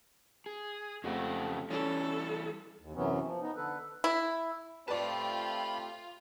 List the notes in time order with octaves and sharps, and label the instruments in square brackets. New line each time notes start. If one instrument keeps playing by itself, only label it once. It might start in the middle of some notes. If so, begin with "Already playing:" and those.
[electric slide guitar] G#4
[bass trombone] F2 [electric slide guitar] C#3 G4 F#5 [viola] A3
[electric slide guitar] E3 G3 [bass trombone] C#4 [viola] A4
[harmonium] D#2
F#2 C3 E3 F#3 B3 C#4
F3
B3 D#4
D3 A4 B4
[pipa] E4
[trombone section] A3 C4 G4 [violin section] F4 [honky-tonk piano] B4 D5 [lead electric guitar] A5 B5